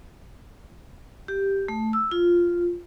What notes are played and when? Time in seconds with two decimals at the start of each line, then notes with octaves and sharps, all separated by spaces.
1.28 G4
1.68 A3
1.93 E6
2.11 F4